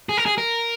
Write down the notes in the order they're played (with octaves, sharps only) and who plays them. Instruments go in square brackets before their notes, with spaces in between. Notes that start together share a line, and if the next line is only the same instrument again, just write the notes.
[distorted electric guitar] G#4
A#4
G#4
A#4